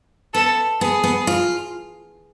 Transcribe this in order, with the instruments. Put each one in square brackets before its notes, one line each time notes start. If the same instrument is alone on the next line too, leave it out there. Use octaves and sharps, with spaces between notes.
[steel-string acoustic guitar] B3 [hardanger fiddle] A4
[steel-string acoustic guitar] B3 [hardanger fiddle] G#4
[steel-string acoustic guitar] B3
F4